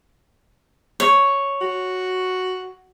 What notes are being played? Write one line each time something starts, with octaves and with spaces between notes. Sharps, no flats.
C#5
F#4